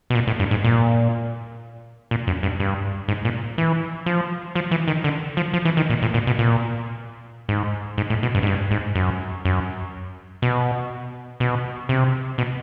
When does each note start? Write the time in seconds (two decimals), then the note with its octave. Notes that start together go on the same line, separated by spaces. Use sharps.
0.10 B2
0.15 A#2
0.27 A2
0.39 G2
0.51 G#2
0.64 A#2
2.11 A#2
2.27 F#2
2.43 G2
2.60 G2
3.08 G#2
3.25 A#2
3.58 E3
4.06 F3
4.55 F3
4.71 E3
4.88 D#3
5.04 D3
5.37 F3
5.53 F3
5.65 E3
5.77 D#3
5.90 A#2
6.02 A2
6.14 A#2
6.27 B2
6.39 A#2
7.49 G#2
7.98 G#2
8.10 A2
8.23 B2
8.35 G2
8.42 G#2
8.47 G2
8.71 G#2
8.95 F#2
9.45 F#2
10.42 B2
11.40 B2
11.89 C3
12.38 B2